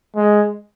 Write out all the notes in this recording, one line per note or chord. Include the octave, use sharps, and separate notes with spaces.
G#3